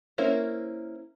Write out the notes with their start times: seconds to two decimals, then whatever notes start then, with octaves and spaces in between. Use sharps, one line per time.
0.18 A#3 C#4 E4 A#4 C5